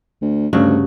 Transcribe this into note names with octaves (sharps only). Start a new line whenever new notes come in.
D2
D2 G2 C#3 F#4